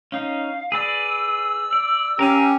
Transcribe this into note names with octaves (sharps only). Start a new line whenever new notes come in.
C#4 D#4 F5
G#4 B4 D5 E6
D5
C#4 G4 A#4 F5 G#5